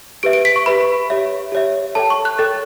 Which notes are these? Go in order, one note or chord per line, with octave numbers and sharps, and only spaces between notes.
G4 B4 E5 D7
D7
B6
C#6
G4 B4 E5 B5
G4 C#5 E5
G4 C#5 E5
A4 C#5 G5 A5
C#6
F#6
A4 C#5 G5 A6